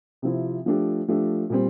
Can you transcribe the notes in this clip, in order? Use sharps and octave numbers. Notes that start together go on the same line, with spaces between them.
C3 F3 C4 E4
F3 A3 D4 G4
F3 A3 D4 G4
A#2 G3 C4